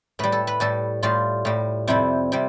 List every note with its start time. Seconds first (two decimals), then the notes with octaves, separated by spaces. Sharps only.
0.19 A2 G3 B4
0.32 A4
0.47 B4
0.60 A2 G3 A4
1.03 A2 G3 F4
1.45 A2 G3
1.87 F2 C3 G3 E4
2.32 C3 G3